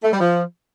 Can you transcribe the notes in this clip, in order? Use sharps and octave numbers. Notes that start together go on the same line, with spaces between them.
A3
G3
F3